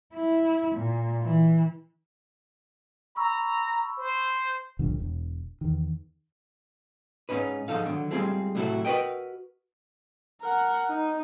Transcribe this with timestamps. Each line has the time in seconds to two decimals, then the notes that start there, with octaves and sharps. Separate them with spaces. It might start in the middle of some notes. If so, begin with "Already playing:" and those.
0.13 E4
0.75 A#2
1.22 E3
3.16 A#5 B5 C#6 E6
3.98 C5
4.79 D1 C2 D3 F3
5.00 E1
5.61 E2 D#3
7.29 G#2 C#4 D#4 B4
7.68 G#2 F3 D#4 A4 F5
7.86 D3 D#3 F#3
8.11 G3 G#3 C4 F4 G#4 A4
8.55 A2 C3 F#3 E4 F#4 A4
8.85 F#4 A#4 B4 D#5 G5
10.41 A#4 F#5
10.89 D#4